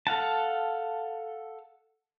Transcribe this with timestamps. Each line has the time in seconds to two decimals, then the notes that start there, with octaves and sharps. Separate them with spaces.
0.07 A4 F5 F#5 A5